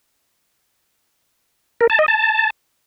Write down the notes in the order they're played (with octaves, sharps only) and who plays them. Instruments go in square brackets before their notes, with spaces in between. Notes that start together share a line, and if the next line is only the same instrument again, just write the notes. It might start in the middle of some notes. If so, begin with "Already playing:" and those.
[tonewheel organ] A#4
A5
D#5
A5